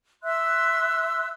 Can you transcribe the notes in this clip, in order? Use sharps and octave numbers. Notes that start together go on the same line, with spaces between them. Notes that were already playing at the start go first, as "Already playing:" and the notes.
E5 C6 E6 F#6